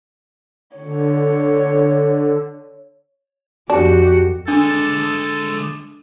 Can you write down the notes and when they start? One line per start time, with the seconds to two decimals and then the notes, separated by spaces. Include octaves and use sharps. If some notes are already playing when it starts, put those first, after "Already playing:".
0.77 D3 C#5
3.70 F2 D4 F#4 G4
4.48 D3 G#3 D4 A4